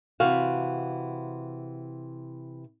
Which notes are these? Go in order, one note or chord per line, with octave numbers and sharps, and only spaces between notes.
C3 E3 F#4 F5